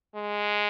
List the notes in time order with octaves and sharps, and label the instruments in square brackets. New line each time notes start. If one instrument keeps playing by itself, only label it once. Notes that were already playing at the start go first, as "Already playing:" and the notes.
[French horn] G#3